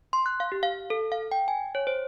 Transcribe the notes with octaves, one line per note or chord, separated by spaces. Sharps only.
C6
F#6
F5
G4
F5
A4
F5
G5
G#5
C#5
C5